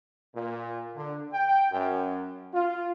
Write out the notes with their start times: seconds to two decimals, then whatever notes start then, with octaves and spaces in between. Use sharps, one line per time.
0.35 A#2
0.96 D3
1.34 G5
1.72 F#2
2.54 F4